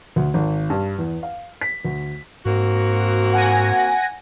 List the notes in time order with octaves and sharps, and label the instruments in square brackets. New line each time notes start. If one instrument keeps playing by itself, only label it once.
[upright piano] D2
G#1
G2
E2
F5
B6
D2
[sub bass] G#2 [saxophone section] A#3 C4 F#4
[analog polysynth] F#5 G#5 A#6